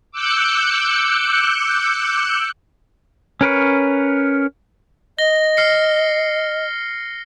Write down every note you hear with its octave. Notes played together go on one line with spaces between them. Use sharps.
D6 E6 F#6 G6 C#7
C#4 A#4 B4 C#5
D#5 A#6 G7
F6 C7 C#7